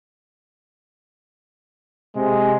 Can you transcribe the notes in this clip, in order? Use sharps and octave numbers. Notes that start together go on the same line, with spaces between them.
C3 G#3